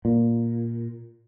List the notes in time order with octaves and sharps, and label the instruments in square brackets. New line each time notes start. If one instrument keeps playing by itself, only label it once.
[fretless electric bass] A#2